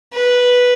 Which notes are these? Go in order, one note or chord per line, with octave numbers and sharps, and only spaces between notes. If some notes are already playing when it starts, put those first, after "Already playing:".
B4